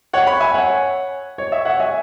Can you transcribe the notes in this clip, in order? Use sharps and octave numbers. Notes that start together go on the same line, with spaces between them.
C#5 F#5
F#5 B5
E5 G#5
C#5 F#5
C#5
E5
C#5 F#5
E5 G#5